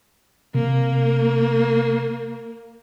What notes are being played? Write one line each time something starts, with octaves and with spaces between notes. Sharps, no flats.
C3 A#3